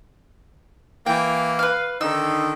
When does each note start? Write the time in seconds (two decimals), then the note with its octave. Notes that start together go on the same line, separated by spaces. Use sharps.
1.06 E3 A#3 G5
1.59 B4 F5
2.01 D3 D#3 D#4 E6